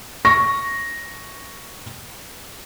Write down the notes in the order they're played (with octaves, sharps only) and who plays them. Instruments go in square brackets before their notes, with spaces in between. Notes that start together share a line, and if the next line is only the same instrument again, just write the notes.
[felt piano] C#6 A#6